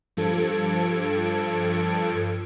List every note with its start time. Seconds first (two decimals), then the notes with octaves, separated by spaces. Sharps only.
0.17 G2 F3 A4 G#6 C#7 D7